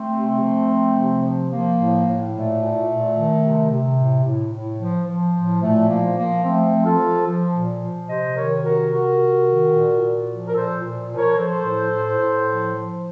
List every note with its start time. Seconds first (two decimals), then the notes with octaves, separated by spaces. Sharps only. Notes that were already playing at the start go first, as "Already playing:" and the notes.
Already playing: A3 C4
0.12 C3
0.40 F3
0.68 F3
0.95 C3
1.22 F3
1.49 F3 A#3
1.77 A2
2.05 A2
2.32 A#2 A3
2.60 A#2
2.88 A#2
3.14 D#3
3.42 C3
3.70 C3
3.96 A2
4.24 A2
4.51 A2
4.79 F3
5.07 F3
5.34 A2
5.61 A#2 A3
5.88 F3 A#3
6.16 F3 A#3
6.43 F3 A3 C4
6.71 F3
6.85 F4 A4
6.98 F3
7.26 F3
7.54 A#2
7.80 F3
8.08 C3 C5 D#5
8.35 D#3 A#4 C#5
8.63 C3 F#4 A#4
8.90 C3 F#4 A#4
9.17 C3
9.45 D#3
9.73 A#2
10.01 A#2
10.28 F3
10.47 A#4
10.54 A#2 A4 C5
10.83 A#2
11.10 F3
11.16 A#4 C#5
11.36 F3 A4 C5
11.64 A2
11.91 A2
12.19 A2
12.47 F3
12.74 F3